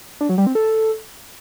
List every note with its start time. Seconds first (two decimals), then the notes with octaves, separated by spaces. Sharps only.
0.21 D4
0.29 F#3
0.38 G3
0.47 C4
0.55 A4